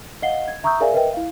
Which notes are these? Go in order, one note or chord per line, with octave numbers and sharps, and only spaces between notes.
D#5 F5 F#5 C7 G7
G#6
E5 A#5 C#6 D#6 E6 G6
G#4 A#4 D5 E5 F5 G#5
A#4 B4 D#5 E5 G5
E4 F5